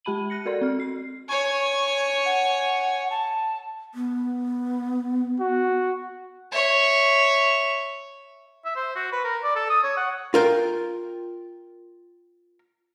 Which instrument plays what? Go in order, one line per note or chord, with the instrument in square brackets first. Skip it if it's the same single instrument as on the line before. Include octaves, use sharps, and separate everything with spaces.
[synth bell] G#3 G4 A5 B5 D#7 F#7
F#6 A#6 C#7
F#4 A4 A#4 D5 C6
C4 F6
F#4 C7
[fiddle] C#5 G#5 [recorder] C#6
[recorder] F#5
A5
[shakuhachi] B3
[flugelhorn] F#4
[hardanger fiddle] C#5 E5
[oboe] E5
C5
F#4
B4
A#4
D5
A4
D#6
C#5
F#5
[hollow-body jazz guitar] F4 A#4 G5